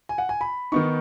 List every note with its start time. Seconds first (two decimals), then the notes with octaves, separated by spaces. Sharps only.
0.09 G#5
0.18 F#5
0.29 G#5
0.41 B5
0.72 D#3 B3 D#4 C#6